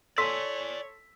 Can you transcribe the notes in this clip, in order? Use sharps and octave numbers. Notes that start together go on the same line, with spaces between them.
A4 C#5 D5 G#5 C6 E6 B6